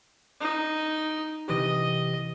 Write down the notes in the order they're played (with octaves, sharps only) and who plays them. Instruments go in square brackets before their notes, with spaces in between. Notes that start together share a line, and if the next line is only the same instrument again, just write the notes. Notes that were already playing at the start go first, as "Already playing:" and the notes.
[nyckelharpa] D#4
[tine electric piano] C3 E3 G4 [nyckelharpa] D#5